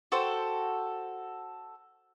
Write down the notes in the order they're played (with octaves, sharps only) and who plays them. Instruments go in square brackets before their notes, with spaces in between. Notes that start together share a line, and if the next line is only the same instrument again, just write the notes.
[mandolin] F#4 A4 C5 G5